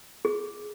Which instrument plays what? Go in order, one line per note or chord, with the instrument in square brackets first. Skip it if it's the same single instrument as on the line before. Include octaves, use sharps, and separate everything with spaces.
[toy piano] G#4